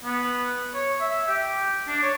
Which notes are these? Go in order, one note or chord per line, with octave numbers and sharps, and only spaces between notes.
B3
C#5
E5
G4
D4
C#5